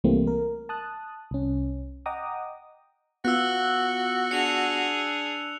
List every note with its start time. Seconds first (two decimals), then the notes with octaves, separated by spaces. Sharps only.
0.04 C2 E3 G3 A3 A#3 C4
0.27 A#4
0.69 A5 D#6 F#6
1.31 C2 C#4
2.06 D#5 F#5 G5 A#5 D6 D#6
3.25 B3 F4 F#4 E6 F#6
4.31 D4 G#4 C#7 F7